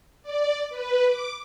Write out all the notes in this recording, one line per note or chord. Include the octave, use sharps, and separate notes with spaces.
D5
B4
D6